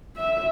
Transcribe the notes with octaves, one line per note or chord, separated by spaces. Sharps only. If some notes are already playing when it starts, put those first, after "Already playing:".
E5